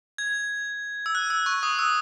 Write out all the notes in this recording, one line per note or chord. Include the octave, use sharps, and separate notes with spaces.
G#6
E6
F#6
E6
C#6
D#6
E6